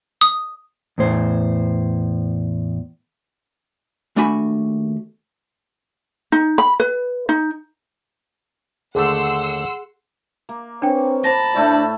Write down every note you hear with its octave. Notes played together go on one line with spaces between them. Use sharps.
D#6
E2 A2 C5
D#2 A3 D4 F#4 G#5 B5
D#4
B5
B4
D#4
D#2 D3 A3 G#4 F#5 C6 E6
A#3
C4 D4 B4 C#5 G5
C5 A5 B5 A#6
A2 A3 D4 A4